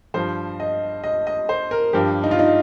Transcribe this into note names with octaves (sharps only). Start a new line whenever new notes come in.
G2 F3 C5
D#5
D#5
D#5
C5
A#4
G2 F3 G4
D#4
F4
D#4